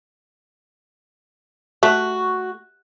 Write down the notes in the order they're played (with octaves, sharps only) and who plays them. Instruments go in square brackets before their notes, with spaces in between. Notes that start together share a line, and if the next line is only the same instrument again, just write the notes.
[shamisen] A3 [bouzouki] F#4